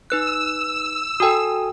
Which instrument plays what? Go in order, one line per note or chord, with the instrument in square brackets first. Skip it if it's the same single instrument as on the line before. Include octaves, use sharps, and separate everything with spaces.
[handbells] D#4 B4 F#6 [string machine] E6
[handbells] F#4 G5 [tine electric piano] A4 G#5 D#6